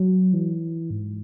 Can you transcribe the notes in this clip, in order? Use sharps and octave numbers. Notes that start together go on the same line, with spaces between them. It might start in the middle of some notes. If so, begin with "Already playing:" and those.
Already playing: F#3
E3
G#2